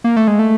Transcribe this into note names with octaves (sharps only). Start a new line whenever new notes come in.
A#3
A3
G#3
A3